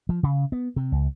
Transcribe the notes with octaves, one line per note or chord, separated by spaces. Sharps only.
F3
C#3
B3
C3
C#2